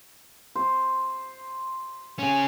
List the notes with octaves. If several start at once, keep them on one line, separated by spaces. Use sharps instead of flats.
C5
C#4 G#4